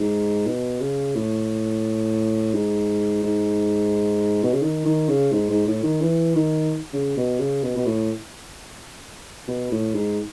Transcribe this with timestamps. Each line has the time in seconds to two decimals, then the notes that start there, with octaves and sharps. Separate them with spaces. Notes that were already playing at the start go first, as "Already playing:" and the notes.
Already playing: G#2
0.47 B2
0.81 C#3
1.15 A2
2.54 G#2
3.23 G#2
4.43 B2
4.54 C#3
4.63 D#3
4.85 D#3
5.09 C#3
5.32 G#2
5.50 G#2
5.67 A2
5.84 D#3
6.01 E3
6.36 D#3
6.93 C#3
7.17 B2
7.40 C#3
7.63 B2
7.77 B2
7.86 A2
9.48 B2
9.72 A2
9.95 G#2